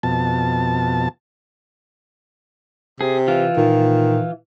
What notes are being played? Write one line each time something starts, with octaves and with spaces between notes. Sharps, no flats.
F2 B2 A5
C3 G#4
E3 F4
A#2 D#3